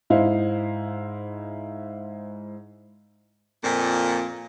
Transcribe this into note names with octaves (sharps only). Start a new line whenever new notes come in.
G#2 E4 C5 D#5 F5
F2 A#2